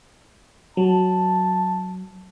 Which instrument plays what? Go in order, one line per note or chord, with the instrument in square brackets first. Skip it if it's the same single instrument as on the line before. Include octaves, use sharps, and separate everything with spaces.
[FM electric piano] F#3 [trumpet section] A5